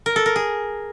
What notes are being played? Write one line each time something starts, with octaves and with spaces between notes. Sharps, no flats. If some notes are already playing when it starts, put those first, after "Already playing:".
A#4
A4
A#4
G#4